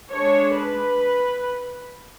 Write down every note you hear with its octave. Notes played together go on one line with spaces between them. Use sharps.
G#3 D4 C#5
B4